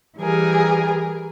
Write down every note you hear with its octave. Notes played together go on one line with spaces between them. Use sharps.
E3 G3 G#4 A#4